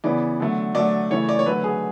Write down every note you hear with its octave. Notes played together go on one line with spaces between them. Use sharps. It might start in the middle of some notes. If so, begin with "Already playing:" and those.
C#3 E3 B3 D5
D3 F#3 A3
D3 F#3 A3 D5
C#3 E3 A3 C#5
D5
C#5
D3 F#3 A3 B4
G#4